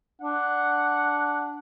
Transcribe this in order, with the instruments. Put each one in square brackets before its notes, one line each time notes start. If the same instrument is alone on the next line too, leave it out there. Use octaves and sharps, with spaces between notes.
[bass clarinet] D4 [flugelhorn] F#5